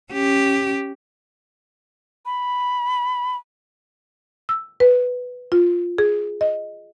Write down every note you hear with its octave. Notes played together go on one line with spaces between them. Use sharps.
C#4 G4
B5
E6
B4
F4
G#4
D#5